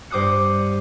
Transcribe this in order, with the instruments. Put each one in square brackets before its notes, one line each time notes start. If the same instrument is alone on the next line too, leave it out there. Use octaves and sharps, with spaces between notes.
[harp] G2 C5 D6 D#6 F#6 C#7